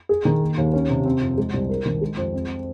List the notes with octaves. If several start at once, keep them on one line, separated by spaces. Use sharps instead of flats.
G#4
D#3
A#3
D#2
C#4
C3
C4
F2
G#3
C2
A#4
D#3
G#3
F2
C4